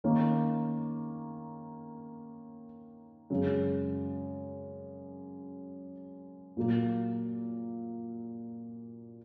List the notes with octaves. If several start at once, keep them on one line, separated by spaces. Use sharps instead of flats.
D#3 A#3 C#4
F#2 C#3 G#3
A#2 F#3 A#3